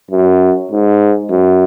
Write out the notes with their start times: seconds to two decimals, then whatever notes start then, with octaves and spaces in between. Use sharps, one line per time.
0.11 F#2
0.72 G#2
1.30 F#2